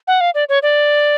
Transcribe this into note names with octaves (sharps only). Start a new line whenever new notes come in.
F#5
F5
D5
C#5
D5